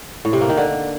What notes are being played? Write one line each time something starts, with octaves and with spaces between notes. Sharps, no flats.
A2
C3
A#3
D#3
D3